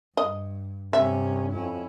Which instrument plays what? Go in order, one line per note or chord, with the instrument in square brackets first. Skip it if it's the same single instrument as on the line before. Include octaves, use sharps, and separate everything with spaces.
[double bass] G2 [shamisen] D#5
[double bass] G2 C#4 [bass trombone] C3 [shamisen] E5
[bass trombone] F2 [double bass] C#4 E4